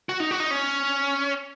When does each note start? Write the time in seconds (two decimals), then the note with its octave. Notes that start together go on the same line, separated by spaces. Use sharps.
0.09 F#4
0.20 D#4
0.31 F#4
0.40 D#4
0.51 C#4